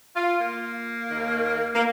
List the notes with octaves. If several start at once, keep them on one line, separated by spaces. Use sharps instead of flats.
F4
A#3
D#2 D#3
A#3